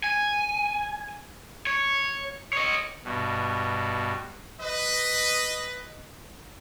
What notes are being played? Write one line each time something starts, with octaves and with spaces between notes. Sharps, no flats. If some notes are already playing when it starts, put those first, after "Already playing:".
G#5
C#5
C#5 D#5
G2 B2
B4 D#5